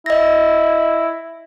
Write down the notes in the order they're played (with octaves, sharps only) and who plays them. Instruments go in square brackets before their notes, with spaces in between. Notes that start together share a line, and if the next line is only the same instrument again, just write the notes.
[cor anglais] E4 [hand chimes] D#5 A#6